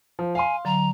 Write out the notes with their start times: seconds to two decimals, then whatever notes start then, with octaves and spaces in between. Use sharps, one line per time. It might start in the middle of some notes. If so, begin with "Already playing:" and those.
0.19 F3
0.35 F5 G#5 C6
0.65 D3 F#3 A#5